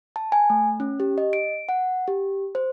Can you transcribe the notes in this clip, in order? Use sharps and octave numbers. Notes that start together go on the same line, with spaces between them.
A5
G#5
A3
C#4
G4
D#5
D7
F#5
G4
C5